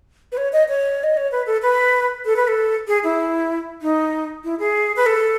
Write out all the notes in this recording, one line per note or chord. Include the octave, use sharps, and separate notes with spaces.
B4
C#5
D#5
C#5
D#5
C#5
B4
A4
B4
A4
B4
A4
G#4
E4
D#4
E4
G#4
B4
A4